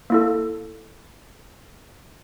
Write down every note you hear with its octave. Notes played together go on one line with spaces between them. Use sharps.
A#3 E4 A4